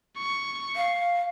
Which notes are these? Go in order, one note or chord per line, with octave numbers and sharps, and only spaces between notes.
C#6
F5